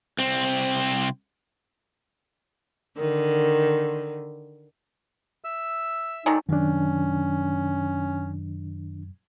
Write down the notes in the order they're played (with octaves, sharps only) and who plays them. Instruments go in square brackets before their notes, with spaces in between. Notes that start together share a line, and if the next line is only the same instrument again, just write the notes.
[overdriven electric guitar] C2 C4
[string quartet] D3 D#3
[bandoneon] E5 E6
[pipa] D#3 F#3 G#3 [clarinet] D#4 [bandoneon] A4 D5
[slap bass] F#2 C3 F#3 [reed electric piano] D#3 D4 [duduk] C#4